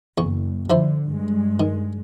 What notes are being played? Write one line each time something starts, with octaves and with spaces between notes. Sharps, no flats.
F#1 E2 C#6
D3 F3 E4 C5
G2 G#3
D#3